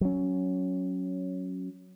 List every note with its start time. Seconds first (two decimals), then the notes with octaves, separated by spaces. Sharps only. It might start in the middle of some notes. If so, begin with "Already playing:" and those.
0.01 F#3 C#4